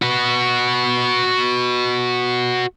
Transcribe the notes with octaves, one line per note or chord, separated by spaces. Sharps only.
F#4 B4